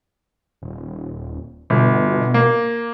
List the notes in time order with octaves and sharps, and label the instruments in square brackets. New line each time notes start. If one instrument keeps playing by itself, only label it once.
[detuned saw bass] D#1
[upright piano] G1 [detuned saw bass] B2
[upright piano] A#3